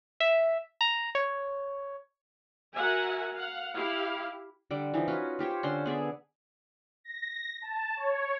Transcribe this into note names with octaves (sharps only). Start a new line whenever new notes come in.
E5
A#5
C#5
F#4 A#4 E5 F#5 G#5
F5 F#5
E4 G4 F5
D3 G3 D6
E3 F3 D#4
C#4 F4 F#4 B4
F4 G4 C5 C#5
D3 C#4 C5 C6
B3 G#4 D5 E5
A#6
A5
C#5